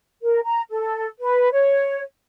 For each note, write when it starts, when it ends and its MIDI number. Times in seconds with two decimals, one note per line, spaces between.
0.22 0.40 70
0.44 0.62 82
0.70 1.07 69
1.20 1.49 71
1.52 2.00 73